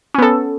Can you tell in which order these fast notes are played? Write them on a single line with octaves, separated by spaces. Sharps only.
C#4 B3 A4